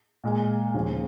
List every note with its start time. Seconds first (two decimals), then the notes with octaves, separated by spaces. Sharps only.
0.24 A#2 G#3
0.74 D#2 C#3 F3